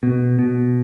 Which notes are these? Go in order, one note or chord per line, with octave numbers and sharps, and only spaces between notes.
B2
B2